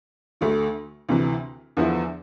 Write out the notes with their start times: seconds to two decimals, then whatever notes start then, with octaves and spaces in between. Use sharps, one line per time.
0.41 D2 D3 A3
1.09 D2 C3 E3
1.77 E2 D3 F3 B3 E4